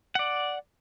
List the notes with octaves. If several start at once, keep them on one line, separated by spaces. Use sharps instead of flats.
D5 F#5